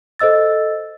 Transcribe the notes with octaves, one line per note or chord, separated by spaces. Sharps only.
A4 C5 D#5 E6 A6